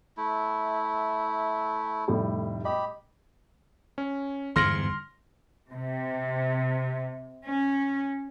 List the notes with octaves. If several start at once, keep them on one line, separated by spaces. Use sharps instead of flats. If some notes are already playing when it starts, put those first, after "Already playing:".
A3 E4
F1 A2 G3
G4 D#5 B5
C#4
G1 E2 G#2 C6 F6 A#6
C3
C#4